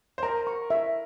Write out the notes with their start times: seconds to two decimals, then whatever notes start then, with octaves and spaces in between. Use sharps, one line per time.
0.18 C5
0.23 A#4 A#5
0.47 C#6
0.70 E5